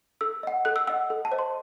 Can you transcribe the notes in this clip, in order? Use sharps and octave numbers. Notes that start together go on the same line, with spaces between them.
A4 E6
D#5 F#5
A4 F#6
E6
D#5 F#5 E6
A4
A5
C5 D#5
C6